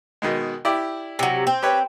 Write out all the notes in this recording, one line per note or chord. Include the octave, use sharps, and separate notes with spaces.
B2 D#3 G#3
E4 G4 D5
C3 F#3
C4
G4 B4 C#5